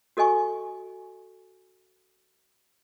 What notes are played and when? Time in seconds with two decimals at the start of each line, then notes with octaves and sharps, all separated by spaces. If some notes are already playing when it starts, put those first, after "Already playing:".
0.17 F#4 A4 D#5 G#5 C#6